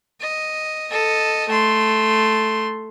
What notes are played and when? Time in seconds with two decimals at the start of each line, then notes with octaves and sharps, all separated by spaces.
0.21 D#5
0.91 A4 D#5
1.48 A3 C6